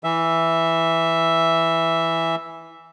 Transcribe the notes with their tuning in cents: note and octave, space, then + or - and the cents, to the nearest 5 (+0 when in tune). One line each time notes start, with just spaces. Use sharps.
E3 +0 E5 +0